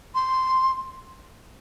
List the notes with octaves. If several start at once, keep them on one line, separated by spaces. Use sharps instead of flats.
C6